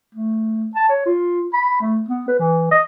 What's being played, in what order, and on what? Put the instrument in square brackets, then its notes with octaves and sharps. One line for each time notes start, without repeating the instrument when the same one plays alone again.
[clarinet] A3
A5
C#5
F4
B5
A3
B3
B4
E3
D#5